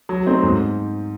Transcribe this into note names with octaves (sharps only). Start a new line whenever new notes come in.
F#3
A3 C4 D#4
G#2